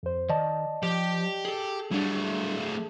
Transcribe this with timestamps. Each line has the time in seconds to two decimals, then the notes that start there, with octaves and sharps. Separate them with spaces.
0.03 F2 C5
0.29 D#3 D5 D#5 A5
0.83 F3 G4
1.45 G#4 A4
1.91 F#3 G3 A3 D4